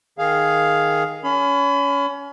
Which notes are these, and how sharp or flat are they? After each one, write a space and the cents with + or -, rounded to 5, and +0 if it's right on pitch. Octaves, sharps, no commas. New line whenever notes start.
D#3 +0 G#4 +0 F5 +0
C#4 +25 B5 +30